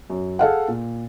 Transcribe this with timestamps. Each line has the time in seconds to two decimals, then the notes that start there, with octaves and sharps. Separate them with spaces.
0.10 F#2
0.39 G#4 A4 F5 F#5
0.68 A#2